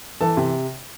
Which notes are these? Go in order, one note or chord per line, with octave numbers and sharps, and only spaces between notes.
E3 A4 A5
C3